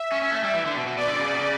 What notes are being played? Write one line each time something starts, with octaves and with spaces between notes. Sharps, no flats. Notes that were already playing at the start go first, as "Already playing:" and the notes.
Already playing: E5
C#4
C#4
A3
G3
E3
D3
B2
B2
B2 D5
D3
C#3
B2
C#3